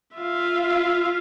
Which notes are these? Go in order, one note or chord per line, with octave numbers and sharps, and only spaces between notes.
F4 E5 F5